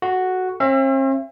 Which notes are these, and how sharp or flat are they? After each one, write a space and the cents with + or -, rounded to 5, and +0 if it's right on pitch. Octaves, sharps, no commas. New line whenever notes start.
F#4 +0 A4 -25
C4 +45 E5 +40